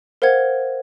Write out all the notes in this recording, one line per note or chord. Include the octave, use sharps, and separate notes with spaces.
A#4 C5 F5 F#5 G#6